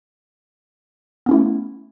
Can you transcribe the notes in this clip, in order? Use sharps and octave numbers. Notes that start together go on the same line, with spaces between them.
A3 B3 C#4 E4